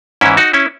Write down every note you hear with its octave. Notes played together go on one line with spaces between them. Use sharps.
G#2 E3 C#4 E4
D#4 F#4
C#4 E4